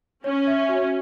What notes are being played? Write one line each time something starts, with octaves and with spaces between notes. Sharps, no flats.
C#4 C#5
E5
F#4